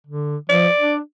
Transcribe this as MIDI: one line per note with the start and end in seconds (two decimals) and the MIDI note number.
0.07 0.37 50
0.49 0.67 53
0.49 0.94 74
0.79 1.00 62